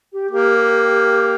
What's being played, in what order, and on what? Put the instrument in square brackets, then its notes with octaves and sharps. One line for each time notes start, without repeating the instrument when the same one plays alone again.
[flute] G4
[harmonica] A#3 [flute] G4